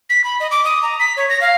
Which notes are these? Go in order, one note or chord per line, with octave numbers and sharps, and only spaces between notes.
B6
B5
D#5
D6
D#6
A#5
B6
C#5
A#6
F5